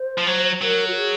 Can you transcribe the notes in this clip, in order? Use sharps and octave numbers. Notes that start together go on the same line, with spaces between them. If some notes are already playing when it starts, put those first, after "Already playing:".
Already playing: C5
F3
F#3
F#3 A#4
F#4
G#4